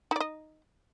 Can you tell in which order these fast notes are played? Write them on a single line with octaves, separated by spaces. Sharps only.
D#4 D5 D#5